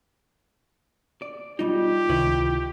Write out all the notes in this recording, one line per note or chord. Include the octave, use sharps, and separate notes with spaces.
D5
B2 G3 D#4 F4 G4
C#2 C3 D#3 E4 B4 C#5